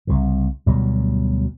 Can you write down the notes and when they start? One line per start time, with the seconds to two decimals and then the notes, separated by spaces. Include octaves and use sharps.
0.07 C2 C#3
0.66 D2 B2 F#3 G3